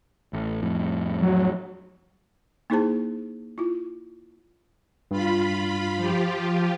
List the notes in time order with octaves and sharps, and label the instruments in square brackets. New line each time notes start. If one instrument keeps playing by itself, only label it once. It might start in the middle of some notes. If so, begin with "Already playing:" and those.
[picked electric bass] A1
F2 A2
[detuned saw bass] F#3
[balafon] A#3 D#4 E4 G#4 C5 A5
E4 F4
[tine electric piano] G2 [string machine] F4 B5
[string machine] F3 F4 G4